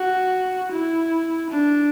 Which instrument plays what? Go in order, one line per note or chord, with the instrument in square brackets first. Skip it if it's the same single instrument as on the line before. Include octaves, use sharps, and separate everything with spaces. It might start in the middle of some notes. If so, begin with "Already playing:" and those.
Already playing: [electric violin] F#4
E4
D4